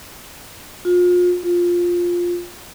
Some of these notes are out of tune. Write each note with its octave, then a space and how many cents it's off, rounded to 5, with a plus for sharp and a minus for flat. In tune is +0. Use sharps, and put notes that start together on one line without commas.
F4 +35
F4 +5